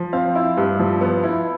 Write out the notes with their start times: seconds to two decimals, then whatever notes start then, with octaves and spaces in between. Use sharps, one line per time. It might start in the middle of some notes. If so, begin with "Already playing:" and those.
Already playing: F3
0.13 C4 F5
0.35 E4
0.57 G2
0.79 F3
1.01 B3
1.24 E4